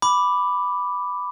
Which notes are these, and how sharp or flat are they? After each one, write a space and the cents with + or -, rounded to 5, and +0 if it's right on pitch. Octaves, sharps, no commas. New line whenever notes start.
B5 +0 D6 +0